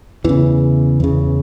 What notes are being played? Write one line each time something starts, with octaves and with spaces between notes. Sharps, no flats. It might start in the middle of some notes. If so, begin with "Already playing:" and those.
E2 C#3 E3
E2 C#3